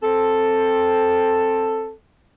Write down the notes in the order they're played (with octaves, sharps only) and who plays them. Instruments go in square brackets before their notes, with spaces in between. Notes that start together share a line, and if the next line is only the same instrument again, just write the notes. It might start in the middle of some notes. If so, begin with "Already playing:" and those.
[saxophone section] C4 A4